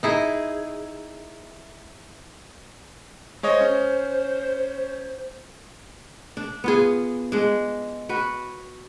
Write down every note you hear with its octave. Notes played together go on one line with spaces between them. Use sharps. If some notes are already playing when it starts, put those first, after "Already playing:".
D#4 E4 G#4
G#3 C5 C#5 D#5
C#4
D4
B3 F4 G#4
G#3 D4
F#4 B4